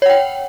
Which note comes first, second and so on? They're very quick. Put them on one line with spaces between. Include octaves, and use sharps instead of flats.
C#5 F#5 G5